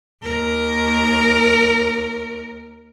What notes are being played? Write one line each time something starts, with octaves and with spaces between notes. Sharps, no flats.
D#2 A#4